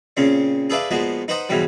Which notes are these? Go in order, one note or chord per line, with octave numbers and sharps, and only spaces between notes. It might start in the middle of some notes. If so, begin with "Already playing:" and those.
A#2 C#3 C4 C#4
G#4 A4 B4 D5 E5 F5
A#2 F3 G#3 B3 F#4
D#4 B4 C5 D#5 F#5 A#5
G#2 B2 E3 F#3 G3